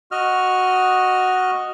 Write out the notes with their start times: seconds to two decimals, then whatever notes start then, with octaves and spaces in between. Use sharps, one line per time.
0.11 F#4 D#5 F6